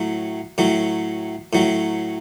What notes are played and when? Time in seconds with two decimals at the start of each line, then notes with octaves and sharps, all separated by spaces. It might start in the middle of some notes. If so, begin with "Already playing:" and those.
Already playing: A2 F#3
0.58 A2 F#3
1.53 A2 F#3